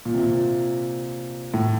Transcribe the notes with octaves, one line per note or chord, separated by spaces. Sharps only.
A#2
C3
A#2
A2